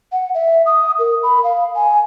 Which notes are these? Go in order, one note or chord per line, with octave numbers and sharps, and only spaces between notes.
F#5
E5
D#6
A#4
B5
F5
G#5